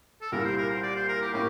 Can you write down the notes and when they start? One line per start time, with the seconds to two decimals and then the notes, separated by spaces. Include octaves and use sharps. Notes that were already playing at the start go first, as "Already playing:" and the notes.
0.21 A4
0.32 C2 A#2 G3 A#4
0.45 C5
0.57 A#4
0.70 C5
0.83 D5
0.95 C5
1.08 A#4
1.21 G4
1.33 A2 A#3 G4